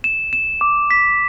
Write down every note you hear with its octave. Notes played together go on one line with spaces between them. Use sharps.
E7
E7
D6
B6